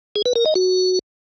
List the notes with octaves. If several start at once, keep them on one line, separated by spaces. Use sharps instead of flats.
G#4
B4
A#4
D#5
F#4